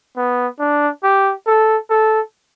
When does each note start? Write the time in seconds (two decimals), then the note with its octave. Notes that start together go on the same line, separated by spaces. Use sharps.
0.17 B3
0.59 D4
1.03 G4
1.47 A4
1.90 A4